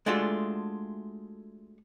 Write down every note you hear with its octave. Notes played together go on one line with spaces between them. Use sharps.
G#3 A3 D4 F4 F#4 A4